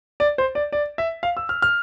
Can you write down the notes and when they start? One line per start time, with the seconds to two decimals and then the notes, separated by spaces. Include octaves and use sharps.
0.20 D5
0.38 C5
0.55 D5
0.72 D5
0.98 E5
1.23 F5
1.37 E6
1.49 F6
1.62 F6